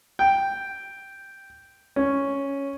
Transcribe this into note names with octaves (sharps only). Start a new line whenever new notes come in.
G5
C#4